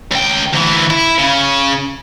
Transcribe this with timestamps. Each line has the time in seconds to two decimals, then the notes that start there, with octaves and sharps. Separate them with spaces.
0.11 C#2 G5
0.53 D2 E3
0.90 E4
1.18 C#3